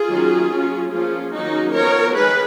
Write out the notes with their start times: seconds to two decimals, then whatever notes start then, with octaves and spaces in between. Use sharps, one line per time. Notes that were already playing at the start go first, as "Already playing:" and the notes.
Already playing: F4 G#4
0.08 D#3 F#3 A#3 C#4
0.50 F#3 C#4
0.91 F3 A#3 C#4 F4 G#4
1.33 D#3 F#3 A#3 C#4 D#4 F#4
1.73 F3 B3 A#4 C#5
2.15 D#3 G#3 G#4 B4